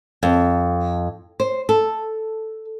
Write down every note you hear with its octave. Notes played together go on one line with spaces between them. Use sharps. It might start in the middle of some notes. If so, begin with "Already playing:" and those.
F2
C5
A4